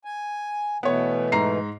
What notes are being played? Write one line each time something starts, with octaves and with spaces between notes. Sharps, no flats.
G#5
B2 E3 A3 B3 C#5
G#2 A#5 C7